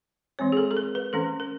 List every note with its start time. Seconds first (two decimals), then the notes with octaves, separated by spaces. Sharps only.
0.39 E3 G#3 C4 C#5
0.52 G#4
0.57 A4
0.71 A4
0.77 A#4
0.95 B4
1.13 E3 A3 C#4 A4
1.40 A#4